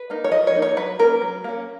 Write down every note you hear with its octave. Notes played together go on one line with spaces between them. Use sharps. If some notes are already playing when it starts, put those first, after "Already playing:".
Already playing: B4
A#3 D#4
C#5
F3 D#5
C#5
A#3 D#4
C#5
F#3 B4
A#3 C#4 A#4
F#3
A#3 C#4